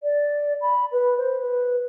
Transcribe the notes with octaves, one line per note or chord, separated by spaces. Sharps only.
D5
B5
B4
C5
B4